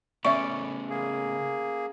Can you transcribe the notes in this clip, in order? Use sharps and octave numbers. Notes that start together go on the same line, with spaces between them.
C#3 A3 B3 C#4 D5 E5 C#6 D7
A#3 G#4